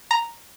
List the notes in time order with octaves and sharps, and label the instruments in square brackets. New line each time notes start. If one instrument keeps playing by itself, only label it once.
[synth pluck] A#5